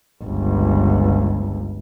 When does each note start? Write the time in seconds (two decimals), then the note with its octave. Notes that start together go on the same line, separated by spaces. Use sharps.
0.23 G1 C#2